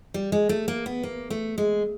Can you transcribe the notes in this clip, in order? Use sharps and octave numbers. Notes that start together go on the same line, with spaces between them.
G3
G#3
A3
A#3
B3
A#3
A3
G#3